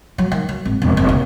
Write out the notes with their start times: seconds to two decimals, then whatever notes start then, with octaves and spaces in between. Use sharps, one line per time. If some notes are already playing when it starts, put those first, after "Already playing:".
0.18 F#3
0.32 D#3
0.49 F#3
0.65 G#1
0.82 E1
0.97 F1
1.09 D#2